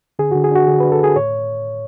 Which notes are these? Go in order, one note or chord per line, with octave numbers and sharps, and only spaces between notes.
D3 G#4
D3 F#4
G#4
D4 F#4
D3 G#4
D4 B4
A4
D3 G#4
A2 C#5